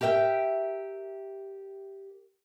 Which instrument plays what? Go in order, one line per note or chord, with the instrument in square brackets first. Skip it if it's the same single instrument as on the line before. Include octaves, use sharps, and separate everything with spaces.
[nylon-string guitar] G4 A#4 E5 F5 G5